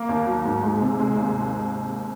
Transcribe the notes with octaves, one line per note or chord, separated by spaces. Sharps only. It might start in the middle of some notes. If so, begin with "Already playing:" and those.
Already playing: A#3
D#2
F#3
G#2
G#3
C3
G#3
D#2